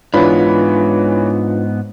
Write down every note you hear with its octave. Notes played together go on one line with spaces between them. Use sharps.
G#2 E3 B3 D4 F4 B4 C#5 B5